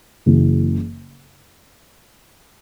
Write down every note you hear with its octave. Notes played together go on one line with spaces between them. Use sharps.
F#1 F#2 C#3 E3